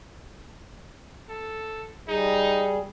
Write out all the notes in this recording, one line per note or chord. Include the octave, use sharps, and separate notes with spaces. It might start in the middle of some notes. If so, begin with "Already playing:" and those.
A4
G3 D#4 G#4